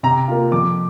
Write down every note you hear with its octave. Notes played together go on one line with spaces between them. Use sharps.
C3 A#5
A#3 F4
F2 D6